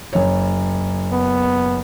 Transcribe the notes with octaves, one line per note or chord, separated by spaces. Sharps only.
F#1 C#5
B3